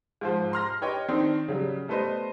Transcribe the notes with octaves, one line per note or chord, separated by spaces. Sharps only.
G#2 F3 C5
A#5 C6 F6 A#6
G4 B4 C#5 D#5 G5
D#3 C4 D4 D#4
C#3 F#3 G3
G3 A3 B3 B4 C5 D#5